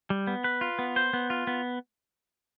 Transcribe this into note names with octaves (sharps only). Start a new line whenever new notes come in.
G3
B3
B4
F4
B3
C5
B3
F4
B3